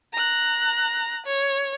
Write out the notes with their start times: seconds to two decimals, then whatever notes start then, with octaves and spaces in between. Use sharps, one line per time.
0.13 A#5 F#6
1.26 C#5